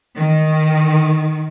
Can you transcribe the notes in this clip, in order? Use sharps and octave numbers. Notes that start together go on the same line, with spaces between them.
D#3